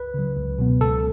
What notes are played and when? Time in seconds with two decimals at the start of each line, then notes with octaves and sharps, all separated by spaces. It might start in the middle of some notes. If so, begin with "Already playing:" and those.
Already playing: C#2 B4
0.14 C#3 F#3
0.37 C#2
0.58 B2 F#3 B3
0.81 C#2 A4